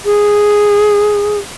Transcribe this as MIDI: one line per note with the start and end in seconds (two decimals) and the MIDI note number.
0.05 1.38 68